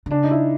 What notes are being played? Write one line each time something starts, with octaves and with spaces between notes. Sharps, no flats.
D3
C#3 D4
D#4
E4